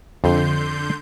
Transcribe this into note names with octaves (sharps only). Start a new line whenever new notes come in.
F2 D3 C6 G6